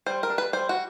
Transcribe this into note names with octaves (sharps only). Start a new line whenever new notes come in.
G3 C5
A#4
D4
B4
G3 C5
F#4